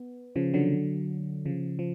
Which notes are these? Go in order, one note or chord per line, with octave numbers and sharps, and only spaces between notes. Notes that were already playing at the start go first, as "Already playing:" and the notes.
Already playing: B3
C#3 F3
D3 F#3
C#3 F3
F3